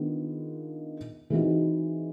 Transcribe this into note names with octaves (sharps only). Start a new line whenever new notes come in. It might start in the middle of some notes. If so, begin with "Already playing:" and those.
Already playing: D#3 G#3 B3 D4 F4
E3 G#3 C4 D#4 F#4